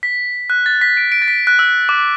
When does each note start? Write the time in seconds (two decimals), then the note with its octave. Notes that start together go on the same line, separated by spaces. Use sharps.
0.03 B6
0.50 F#6
0.66 A6
0.82 B6
0.97 D7
1.12 D7
1.22 A6
1.28 B6
1.47 F#6
1.59 E6
1.89 D6